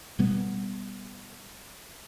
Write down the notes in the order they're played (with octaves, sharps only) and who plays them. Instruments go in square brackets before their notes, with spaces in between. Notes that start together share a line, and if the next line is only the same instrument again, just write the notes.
[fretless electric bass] B2 G3 B3